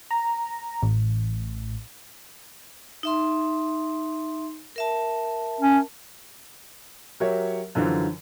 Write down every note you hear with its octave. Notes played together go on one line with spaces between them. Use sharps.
A#5
A1
D#4 E5 C6
A#4 E5 A5
C#4
F#3 G4 A#4 C#5 E5
F#2 D3 E3 F3